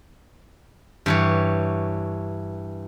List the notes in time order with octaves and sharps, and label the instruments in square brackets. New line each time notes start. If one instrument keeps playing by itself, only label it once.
[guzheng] G2 E3 C#5